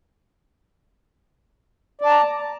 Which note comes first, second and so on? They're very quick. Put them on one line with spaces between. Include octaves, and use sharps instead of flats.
D5 A5 A#5